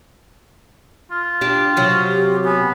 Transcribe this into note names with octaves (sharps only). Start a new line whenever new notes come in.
F4
D4 G4
C3 F#3
G4
B3 G#5